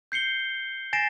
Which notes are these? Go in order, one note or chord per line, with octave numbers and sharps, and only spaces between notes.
G6 C7 C#7 G7
G#5 A6 A#6 C7 D7 E7